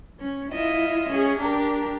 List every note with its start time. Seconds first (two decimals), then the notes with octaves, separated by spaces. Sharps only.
0.19 C#4
0.52 E4 F4 D#5 E5
1.08 C#4 G#4
1.39 D4 G4 A#4